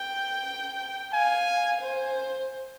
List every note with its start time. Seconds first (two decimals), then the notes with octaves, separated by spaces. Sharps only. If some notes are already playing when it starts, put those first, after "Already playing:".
Already playing: G5
1.13 F5 G#5
1.81 C5